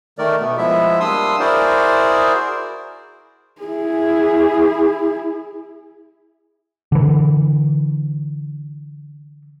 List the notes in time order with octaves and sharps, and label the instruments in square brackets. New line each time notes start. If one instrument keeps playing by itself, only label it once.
[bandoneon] D#3 A3 A#4 D5
B2 A3 B3
F3 G#3 B3 E4 E5
G3 A#3 D4 C6 D#6 E6
E4 F#4 G#4 A#4 C5 D5
[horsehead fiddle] E4 G#4
[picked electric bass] D3 E3